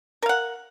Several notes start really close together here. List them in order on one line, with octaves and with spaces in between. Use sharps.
A#4 F5 F#5